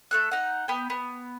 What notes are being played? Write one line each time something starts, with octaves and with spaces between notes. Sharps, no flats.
A3 A4 F#6
D#4 F#5
B3 G5
B3